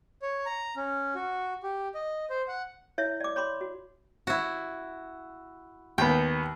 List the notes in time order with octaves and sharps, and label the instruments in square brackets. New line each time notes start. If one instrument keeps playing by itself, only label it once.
[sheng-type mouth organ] C#5
A#5
C#4
F#4
G4
D#5
C5
F#5
[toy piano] E4 C#5 E5
D5 D6
C#5 B5 C6 D6
F#4
[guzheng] E4 F#4
[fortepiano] D#2 B3 [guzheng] G5